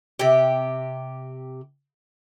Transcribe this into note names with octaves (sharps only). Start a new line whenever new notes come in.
C3 G4